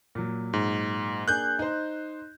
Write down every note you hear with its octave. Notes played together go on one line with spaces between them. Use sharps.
A#2 F#3
G#2
A#3 D4 G#4 F#6 G6
D#4 C5